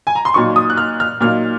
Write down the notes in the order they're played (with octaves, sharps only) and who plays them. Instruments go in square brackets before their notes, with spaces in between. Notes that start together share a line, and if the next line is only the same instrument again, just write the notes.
[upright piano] G#5
A#5
C6
A#2 F#3 A#3 D#4 C#6
D#6
F#6
F6
F6
A#2 F#3 A#3 D#4 F6